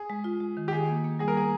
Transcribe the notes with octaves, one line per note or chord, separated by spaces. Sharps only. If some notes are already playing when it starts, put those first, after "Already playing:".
Already playing: G#4
G#3
F4
G#3
D#3
G4
D#3 G#4
A#3
A#3
G3 G#4
A#4
A#3 G#4